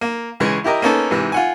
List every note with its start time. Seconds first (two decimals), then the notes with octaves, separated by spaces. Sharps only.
0.01 A#3
0.40 C#2 C#3 E3 G#3
0.64 E4 G4 A#4 D#5
0.82 A#3 B3 C#4 D#4 A4
1.11 G#2 C3 E3
1.32 F4 F#5 G#5